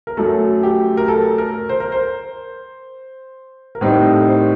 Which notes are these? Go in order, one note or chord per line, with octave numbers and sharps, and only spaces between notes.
A#4
F#2 F#3 A3 A4
G4
A#4
A4
A#4
C5
A#4
C5
A#4
A2 G3 C4 D#4 C5
A4
A#4
C5